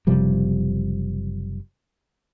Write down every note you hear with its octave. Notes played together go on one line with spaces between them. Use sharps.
F#1 C3 F3 G3